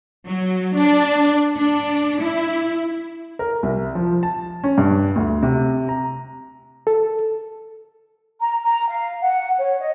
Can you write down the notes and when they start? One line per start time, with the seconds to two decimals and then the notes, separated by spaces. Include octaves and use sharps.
0.26 F#3
0.75 D4
1.57 D4
2.20 E4
3.39 A#4
3.63 C2
3.95 F3
4.23 A5
4.64 C#4
4.78 G2
5.16 D2
5.43 C3
5.89 A#5
6.87 A4
8.41 A#5
8.63 A#5
8.89 F5
9.21 F#5
9.59 C#5
9.80 D#5